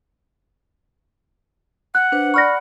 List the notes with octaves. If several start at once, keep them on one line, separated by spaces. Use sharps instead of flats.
F#5 F#6
D4 B4 C5
D5 B5 C#6 F6 A#6